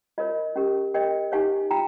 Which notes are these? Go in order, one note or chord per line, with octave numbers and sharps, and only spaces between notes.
F4 A#4 C#5 D#5
C#4 G4 A#4
G4 A#4 C#5 D#5 G5
D#4 G4 C#5 F5 G#5
F4 G5 A#5